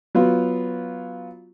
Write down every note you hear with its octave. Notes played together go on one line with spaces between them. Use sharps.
F#3 B3 F4